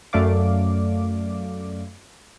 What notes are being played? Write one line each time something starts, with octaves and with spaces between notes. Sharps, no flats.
F#2 A3 D5 F5 D6